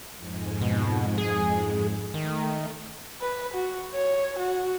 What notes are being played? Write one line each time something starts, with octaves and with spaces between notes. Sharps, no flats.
F2 G#2 G#3
B2
G#4
D#3 A3
B4
F#4
C#5
F#4